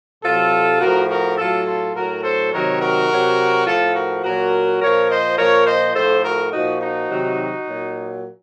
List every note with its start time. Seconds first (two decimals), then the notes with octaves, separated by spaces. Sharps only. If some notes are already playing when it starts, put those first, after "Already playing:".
0.24 C3 F#3 F4 A4
0.81 A2 F3 F#4 A#4
1.09 F#4 A#4
1.38 A2 F#3 F4 A4
1.67 F4 A4
1.95 A2 F#3 F#4 A#4
2.24 A4 C5
2.53 C3 D#3 F#3 A#4 C#5
2.81 F#4 A#4
3.10 C3 F#3
3.67 A2 F3 F4 A4
3.95 F#4 A#4
4.24 A#2 F#3 F#4 A#4
4.82 A#2 F3 A#4 C#5
5.10 C5 D#5
5.38 A#2 F3 A#4 C#5
5.67 C5 D#5
5.95 A2 F3 A4 C5
6.24 F#4 A#4
6.53 A#2 F3 D#4 F#4
6.81 D#4 F#4
7.10 C3 D#3 F#3
7.67 A#2 F#3